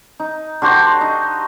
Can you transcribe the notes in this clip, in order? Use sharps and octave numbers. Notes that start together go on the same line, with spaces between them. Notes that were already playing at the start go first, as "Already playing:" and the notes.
D#4
D3 F#4 G4 C5
D#4